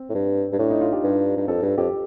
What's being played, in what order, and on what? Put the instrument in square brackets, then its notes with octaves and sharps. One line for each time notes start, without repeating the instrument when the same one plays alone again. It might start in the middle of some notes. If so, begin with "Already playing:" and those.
Already playing: [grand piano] C4
[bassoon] A2
G2
G2
[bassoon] A2 [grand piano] D4
[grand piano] D#4
F4
G4
[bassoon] G2
G2
[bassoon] F2 [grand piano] A4
[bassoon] G2 [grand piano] A4
[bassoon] F2 [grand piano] G4